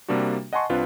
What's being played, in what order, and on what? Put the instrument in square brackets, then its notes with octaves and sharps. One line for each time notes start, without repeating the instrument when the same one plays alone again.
[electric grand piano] C3 G3 A#3 D4 F#4
D#5 F#5 G#5 A5 C6 C#6
C2 C4 D4 F4 B4